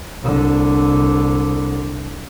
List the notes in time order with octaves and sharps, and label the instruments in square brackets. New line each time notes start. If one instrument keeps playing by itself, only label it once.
[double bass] C2 D3